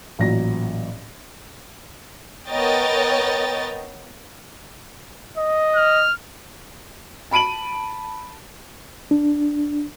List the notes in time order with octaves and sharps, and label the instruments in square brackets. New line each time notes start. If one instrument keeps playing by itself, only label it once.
[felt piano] A1 A#2 F#3 A#6
[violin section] B3 A#4 C#5 D#5 G5 A6
[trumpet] D#5
[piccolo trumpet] F6
[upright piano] A5 B5 D7 D#7 F#7
[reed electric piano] D4